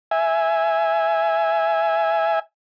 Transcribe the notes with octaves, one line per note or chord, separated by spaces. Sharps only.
E5 G#5